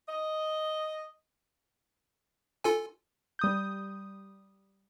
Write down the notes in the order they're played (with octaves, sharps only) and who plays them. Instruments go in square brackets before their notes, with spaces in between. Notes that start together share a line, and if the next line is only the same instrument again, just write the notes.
[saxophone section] D#5
[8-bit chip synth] F4 A4 G#5
[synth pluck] G3 D#6 G6